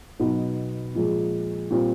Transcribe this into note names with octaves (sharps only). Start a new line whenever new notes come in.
B2 F#3 B3 D#4
A#2 F3 G#3
A#2 G3 C4